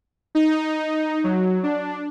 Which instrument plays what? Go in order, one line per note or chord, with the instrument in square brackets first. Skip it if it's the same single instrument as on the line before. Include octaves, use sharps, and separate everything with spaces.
[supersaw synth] D#4
F#3
D4